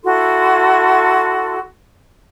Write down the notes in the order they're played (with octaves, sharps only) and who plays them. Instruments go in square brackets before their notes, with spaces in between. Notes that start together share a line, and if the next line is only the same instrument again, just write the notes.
[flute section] E4 F#4 A4 C6